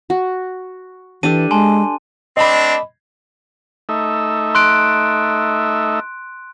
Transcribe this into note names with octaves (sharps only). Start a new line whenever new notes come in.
F#4
E3 D4 G4 A4 D#7
G#3 G#5 A5 C6
A3 C4 D4 D#5 B5
A3 D#4 E5
C6 F#6 D7